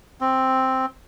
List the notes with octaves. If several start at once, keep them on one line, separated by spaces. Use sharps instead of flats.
C4